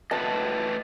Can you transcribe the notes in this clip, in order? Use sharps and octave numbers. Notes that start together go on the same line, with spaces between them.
A3 B4 D#5 A5